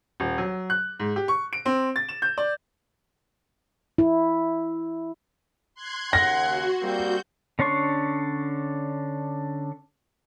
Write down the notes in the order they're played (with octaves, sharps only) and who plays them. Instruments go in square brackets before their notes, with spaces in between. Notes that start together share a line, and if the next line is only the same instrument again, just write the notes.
[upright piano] D#1
F#3
F#6
G#2
G4
C#6
D7
C4
A6
E7
G6
D5
[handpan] E4
[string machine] C6 F#6 G#6
[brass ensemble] D#2 C#3 F#5 [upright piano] A#6
[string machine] F#4
[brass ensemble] G3 A#3 C4 [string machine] F#4 G6
[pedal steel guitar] D3 C#4 D4 C6 C#6